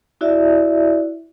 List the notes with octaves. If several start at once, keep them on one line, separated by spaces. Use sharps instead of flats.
E4 F#4 D5 E5